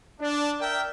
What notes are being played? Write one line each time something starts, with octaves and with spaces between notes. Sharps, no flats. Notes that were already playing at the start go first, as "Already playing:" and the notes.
D4
A#4 D5 E5 G5